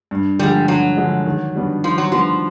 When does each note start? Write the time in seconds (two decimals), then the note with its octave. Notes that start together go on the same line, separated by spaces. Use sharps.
0.11 G2
0.39 D3 F3 G3 G#3
0.68 G2 F#3
0.97 D3 F3 G#3
1.26 D#3
1.55 G3 B3 D4 F#4
1.84 D#3 F3
1.98 F#3
2.12 F3 G3 B3 D4 F#4